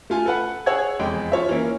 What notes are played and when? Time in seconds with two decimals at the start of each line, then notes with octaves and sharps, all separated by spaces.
0.10 A3 F4 G#5
0.26 A4 B4 F#5
0.66 G#4 C#5 F#5 E6 G#6
0.99 F1 E2 G#3 G5
1.32 F4 C#5 E5
1.49 E3 A#3 C#4